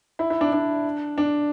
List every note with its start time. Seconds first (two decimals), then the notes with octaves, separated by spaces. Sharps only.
0.19 E4
0.30 E4
0.41 D4
0.52 D4
1.18 D4